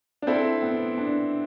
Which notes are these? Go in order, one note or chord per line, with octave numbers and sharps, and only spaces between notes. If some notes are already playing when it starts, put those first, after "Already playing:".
D4
C4 E4 A4
B3
D4